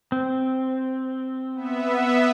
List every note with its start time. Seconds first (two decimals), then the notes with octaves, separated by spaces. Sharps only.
0.12 C4
1.55 B3 E5